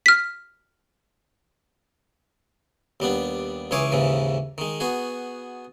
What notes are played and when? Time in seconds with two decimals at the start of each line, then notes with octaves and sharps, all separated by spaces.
0.06 F6 B6
3.00 D#2 G3 B3 D4
3.71 C#2 E3 G#4 C#5 D6
3.92 D#2 G#2 C#3 E3
4.58 D#3 G#3
4.80 B3 F#4 G#4